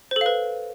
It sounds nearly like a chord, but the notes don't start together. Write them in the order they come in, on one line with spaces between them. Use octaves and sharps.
C5 A4 F5 B4